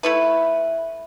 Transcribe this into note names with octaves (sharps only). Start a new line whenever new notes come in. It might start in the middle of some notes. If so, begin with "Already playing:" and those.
A3 E4 B4 E5